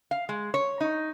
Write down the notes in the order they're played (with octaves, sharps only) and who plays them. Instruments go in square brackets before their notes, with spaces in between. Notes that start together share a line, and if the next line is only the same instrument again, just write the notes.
[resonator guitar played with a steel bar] F5
G#3
C#5
D#4